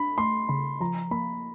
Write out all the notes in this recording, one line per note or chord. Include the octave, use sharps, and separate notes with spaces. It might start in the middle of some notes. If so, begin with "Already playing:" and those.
Already playing: D4 B5
A3 C6
C#3 B5
F3 A#5
A#3 B5